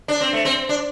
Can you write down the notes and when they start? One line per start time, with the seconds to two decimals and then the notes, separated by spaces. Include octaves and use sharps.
0.08 D4
0.21 C4
0.33 A3
0.45 C4
0.69 D4